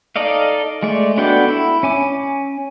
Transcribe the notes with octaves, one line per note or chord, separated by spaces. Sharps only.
D#4 A4 D5 D#5 F5
G#3 A3 D5
B3 D4 F#4 A4 G5
E4
C#4 G#5 D6